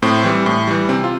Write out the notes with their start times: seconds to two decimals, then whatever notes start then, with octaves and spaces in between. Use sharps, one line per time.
0.02 A2 C4
0.24 E3 G3
0.46 A2
0.67 E3 G3
0.89 C3 C4
1.04 F4